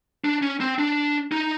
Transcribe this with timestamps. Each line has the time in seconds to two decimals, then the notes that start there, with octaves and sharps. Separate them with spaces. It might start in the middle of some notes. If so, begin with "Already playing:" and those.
0.24 D4
0.42 C#4
0.60 C4
0.79 D4
1.32 D#4